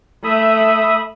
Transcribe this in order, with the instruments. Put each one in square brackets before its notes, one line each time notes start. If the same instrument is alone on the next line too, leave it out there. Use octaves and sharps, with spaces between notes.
[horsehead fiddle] A3 [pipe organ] E5 B5 D#6